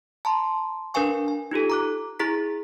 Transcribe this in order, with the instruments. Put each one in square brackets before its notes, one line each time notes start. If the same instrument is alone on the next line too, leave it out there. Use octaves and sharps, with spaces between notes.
[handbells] A5 A#5 C6
D4 A#4 B4 F5 G#5 C#6
G#5
D#4 F4 G4 A4
A#5 D6 F#6
E4 G#4 A#5 B6